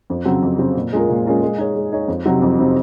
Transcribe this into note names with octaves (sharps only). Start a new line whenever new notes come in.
F2
C#3 F#3 C4 F#4
F2
C#3 F#3 C4 F#4
A#2
G#3 C#4 F4 A#4
A#2
G#3 C#4 F4 A#4
G#3
D#4 G#4 C#5
G#3
D#4 G#4 C#5
F2
C3 F#3 C4 D#4
F2
C3 F#3 C4 D#4